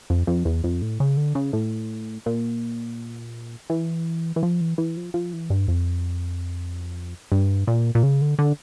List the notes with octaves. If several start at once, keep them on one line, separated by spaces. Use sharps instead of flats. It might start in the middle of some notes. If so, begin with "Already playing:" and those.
F2
F2
E2
F2
A2
C#3
D3
C#3
A2
A#2
E3
E3
F3
E3
E3
F3
F3
E3
G2
F2
G2
A#2
A#2
C#3
D3
D3